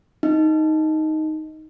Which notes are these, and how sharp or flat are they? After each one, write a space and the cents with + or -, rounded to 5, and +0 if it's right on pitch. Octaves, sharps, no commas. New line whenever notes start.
D#4 +5